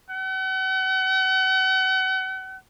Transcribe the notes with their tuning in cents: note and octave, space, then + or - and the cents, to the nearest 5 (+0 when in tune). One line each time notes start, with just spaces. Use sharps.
F#5 +40